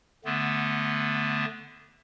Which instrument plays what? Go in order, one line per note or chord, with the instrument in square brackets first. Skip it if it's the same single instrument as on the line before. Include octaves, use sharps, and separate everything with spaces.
[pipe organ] D3 A3 B3